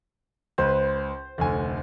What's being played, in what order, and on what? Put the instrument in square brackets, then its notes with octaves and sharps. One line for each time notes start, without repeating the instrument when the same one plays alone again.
[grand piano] C#2 B4 [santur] C5
[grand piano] F1 D2 G#5